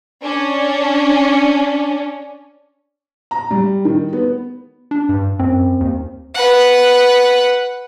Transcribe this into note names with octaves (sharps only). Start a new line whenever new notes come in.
C#4 D4
A#5
G3
D#3
B3
D4
G2
F#2 C4
D#2
B4 F#5